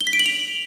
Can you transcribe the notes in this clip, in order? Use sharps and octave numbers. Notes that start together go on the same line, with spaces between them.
G7
B6
D7
F#7
F7